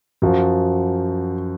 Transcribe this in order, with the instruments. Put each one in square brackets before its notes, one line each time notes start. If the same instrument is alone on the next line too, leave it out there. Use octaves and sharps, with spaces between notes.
[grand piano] F#2 F3 F#4